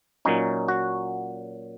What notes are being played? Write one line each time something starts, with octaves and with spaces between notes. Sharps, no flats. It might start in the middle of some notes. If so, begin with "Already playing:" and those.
A#2 F#3 C#4 D#4
F#4